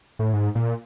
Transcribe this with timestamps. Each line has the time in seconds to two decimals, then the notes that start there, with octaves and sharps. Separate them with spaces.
0.19 A2
0.33 G#2
0.55 A#2